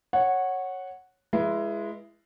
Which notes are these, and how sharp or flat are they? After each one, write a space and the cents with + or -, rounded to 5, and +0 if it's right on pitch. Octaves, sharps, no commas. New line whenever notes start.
C#5 -10 F#5 +0
G#3 +0 E4 +25 B4 -25